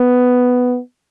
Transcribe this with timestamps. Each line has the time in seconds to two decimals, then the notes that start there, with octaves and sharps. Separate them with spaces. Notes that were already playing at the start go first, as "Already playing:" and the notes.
Already playing: B3